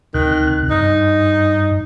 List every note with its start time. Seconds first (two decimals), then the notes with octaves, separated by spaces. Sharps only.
0.14 D2 C3 D#3 F#6
0.70 G2 D#4